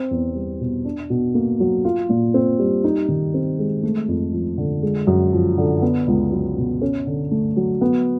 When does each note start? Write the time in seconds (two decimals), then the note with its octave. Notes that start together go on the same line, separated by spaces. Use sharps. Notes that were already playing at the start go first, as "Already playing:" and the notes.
Already playing: C4
0.11 E2
0.35 G3
0.60 B2
0.85 D4
1.10 B2
1.34 A#3
1.60 F#3
1.85 F4
2.09 A#2
2.34 C4
2.59 G3
2.84 D#4
3.09 D#3
3.34 C4
3.59 G#3
3.83 A3
4.08 F2
4.33 F3
4.58 D3
4.82 G#3
5.07 F#2
5.33 F3
5.58 D3
5.82 B3
6.07 C#2
6.32 F#3
6.57 B2
6.82 C#4
7.07 D3
7.31 A3
7.57 F#3
7.81 B3